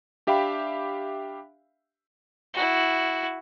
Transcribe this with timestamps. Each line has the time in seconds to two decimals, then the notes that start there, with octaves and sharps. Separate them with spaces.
0.27 D4 G4 E5 F5 G5 B5
2.54 E4 F#4